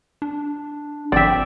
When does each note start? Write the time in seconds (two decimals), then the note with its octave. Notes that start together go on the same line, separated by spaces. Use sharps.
0.22 D4
1.12 G#1 C4 D5 E5 G5